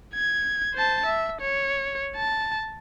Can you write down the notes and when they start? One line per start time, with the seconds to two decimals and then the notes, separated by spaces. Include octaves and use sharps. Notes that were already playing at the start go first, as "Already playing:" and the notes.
0.14 G#6
0.74 C5 A5
1.06 E5
1.41 C#5
2.16 A5